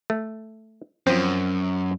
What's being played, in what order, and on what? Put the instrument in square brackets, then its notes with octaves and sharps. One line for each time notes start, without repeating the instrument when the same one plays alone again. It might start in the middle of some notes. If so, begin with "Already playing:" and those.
[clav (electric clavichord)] A3
[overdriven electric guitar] F#2 [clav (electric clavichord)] F3 C4